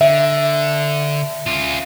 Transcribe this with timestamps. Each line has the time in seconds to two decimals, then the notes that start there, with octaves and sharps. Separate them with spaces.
0.01 D3 E5
1.46 C#4 F4